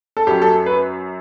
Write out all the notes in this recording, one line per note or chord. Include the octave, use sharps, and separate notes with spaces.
A4
F#2 F#3 G4
A4
B4